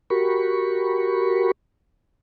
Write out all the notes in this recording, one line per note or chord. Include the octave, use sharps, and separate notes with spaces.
F#4 G4 A#4 B5 C#6